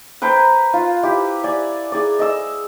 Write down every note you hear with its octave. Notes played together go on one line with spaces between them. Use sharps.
B4 C5 G5 A#5
F4
E4 G4
D5 G#5
G#4 D5
D#5 E6